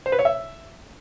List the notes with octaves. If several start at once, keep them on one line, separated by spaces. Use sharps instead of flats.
C5
B4
C#5
E5